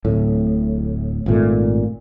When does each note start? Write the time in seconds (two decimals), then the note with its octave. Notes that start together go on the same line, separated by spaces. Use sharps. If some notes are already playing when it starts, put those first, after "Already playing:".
0.05 D1 A2
1.26 G#1 A#2 A3